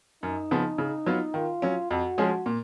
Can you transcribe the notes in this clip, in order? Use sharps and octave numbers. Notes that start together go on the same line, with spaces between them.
F#2 D#4
C#3 F3 B3
C#3
F#3 B3 F4
D#3 F4
F#3 C#4
F2 F#4
F3 G#3 C#4 G#4
A#2